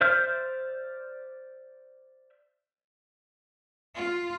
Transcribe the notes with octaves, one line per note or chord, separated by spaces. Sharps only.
C5 D5 E5 F6 G6
F4